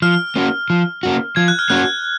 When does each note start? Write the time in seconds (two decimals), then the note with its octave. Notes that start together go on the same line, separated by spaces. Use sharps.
0.02 F3 F6
0.36 A#3 C#4 F#4
0.70 F3
1.03 A#3 C#4 F#4
1.36 F3 G#6
1.48 F#6
1.59 F6
1.70 A#3 C#4 F#4 F#6